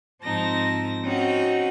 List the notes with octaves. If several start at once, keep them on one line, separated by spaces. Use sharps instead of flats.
G#2 F3 C4 D#4 A5 A#6
C4 C#4 D#4 F#4 F#5 G5